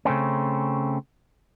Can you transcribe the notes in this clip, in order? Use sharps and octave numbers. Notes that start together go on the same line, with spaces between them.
C#3 A3 C4 C#4